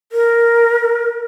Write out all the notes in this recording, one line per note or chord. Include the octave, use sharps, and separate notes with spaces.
A#4